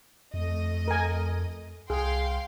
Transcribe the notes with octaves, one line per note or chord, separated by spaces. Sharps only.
F2 A3 D#5
A#4 G#5
C2 G#4 F5 G5 C6